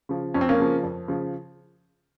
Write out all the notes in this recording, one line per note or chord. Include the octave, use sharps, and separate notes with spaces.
C#3 F3
F2 C#4
C4
A#3 C#4
C#3 F3
F2
C#3 F3